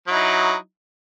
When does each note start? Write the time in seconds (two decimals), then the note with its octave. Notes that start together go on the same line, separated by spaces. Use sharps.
0.07 F#3
0.10 E4
0.12 D#4